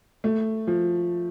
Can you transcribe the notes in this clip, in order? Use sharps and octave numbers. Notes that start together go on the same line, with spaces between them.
A3
F3